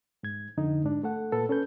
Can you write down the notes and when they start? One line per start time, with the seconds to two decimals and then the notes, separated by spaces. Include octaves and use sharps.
0.23 G#2 G#6
0.57 F2 D3 D#4
0.83 G#2 D4
1.03 A3 A4 F#5
1.32 A#2 A4 B4
1.49 C#4 A4 B4 G6